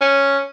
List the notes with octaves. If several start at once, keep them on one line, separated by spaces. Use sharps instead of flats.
C#4